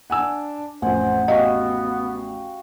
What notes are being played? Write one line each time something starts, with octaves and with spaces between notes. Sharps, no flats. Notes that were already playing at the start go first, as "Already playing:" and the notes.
D4 F#5 G#5 E6
A1 F2 C5 F#5 G#5
B3 F#4 G4 D#5 F5